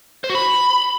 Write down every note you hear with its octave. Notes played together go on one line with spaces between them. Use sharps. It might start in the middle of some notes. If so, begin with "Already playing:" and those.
C5
F#4
B5